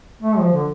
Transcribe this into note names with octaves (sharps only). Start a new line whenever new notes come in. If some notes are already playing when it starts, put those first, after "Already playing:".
A3
F3
D3